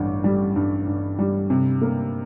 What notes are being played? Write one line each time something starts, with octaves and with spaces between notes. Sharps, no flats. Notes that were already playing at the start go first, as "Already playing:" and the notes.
Already playing: A1 G2
G3
G2
G2
G3
C3
A#3